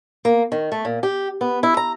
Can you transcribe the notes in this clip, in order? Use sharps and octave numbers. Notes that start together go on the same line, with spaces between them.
A#3
D#3
A3
A#2
G4
B3
E4
A#5